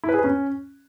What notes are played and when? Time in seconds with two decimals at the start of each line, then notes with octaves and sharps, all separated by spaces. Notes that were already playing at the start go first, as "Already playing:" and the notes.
0.04 E4
0.09 B4
0.14 G#4
0.19 B4
0.24 C#4